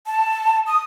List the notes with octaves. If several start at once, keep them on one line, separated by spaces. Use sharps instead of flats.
A5
D#6